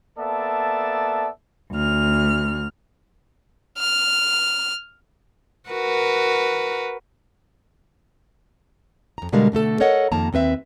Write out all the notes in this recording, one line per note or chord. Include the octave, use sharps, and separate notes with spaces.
A#3 B3 A4 D5 E5 A5
D2 F6
F6
F#4 A#4 B4
F2 A#5
B2 D3 G3 G#3 A#4 F5
B2 D3 A3 A4
A4 A#4 C#5 D#5 F#5
F2 D#3 A#3 A5 A#5
D#2 C4 B4 E5